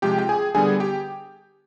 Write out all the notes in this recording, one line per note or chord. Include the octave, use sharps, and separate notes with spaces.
C3 F3 G#3 G4 G5
G5
G#4 G#5
D3 G3 B3 G#4 G#5
G4 G5